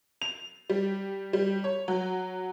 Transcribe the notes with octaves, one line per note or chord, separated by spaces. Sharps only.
F7
G3
G3
C#5
F#3